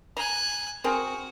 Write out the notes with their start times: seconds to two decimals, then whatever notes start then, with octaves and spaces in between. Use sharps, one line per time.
0.17 G#5 A#5 F#6
0.84 C4 F#4 G#4 A#4